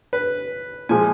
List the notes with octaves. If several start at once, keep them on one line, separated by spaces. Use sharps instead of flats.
B4
A#2 F3 G#3 G#5